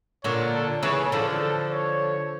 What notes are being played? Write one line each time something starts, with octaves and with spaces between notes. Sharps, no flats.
A#2 D3 C#5
A4
C#3 E3 C#5
D3 F3 A4
A4
C#5